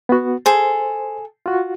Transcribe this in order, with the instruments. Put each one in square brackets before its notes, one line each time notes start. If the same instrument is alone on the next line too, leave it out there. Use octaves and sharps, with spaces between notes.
[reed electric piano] B3 F#4
[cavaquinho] G#4 A4 [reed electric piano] C5
[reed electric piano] F4 F#4